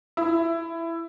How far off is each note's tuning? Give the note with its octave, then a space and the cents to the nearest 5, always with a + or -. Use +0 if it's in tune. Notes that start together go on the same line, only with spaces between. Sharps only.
E4 +15